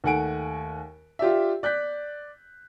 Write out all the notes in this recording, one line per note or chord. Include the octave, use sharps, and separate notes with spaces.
D#2 A3 F#5 G#5 D7
F4 G4 D5 E5
D5 F#6 G6 B6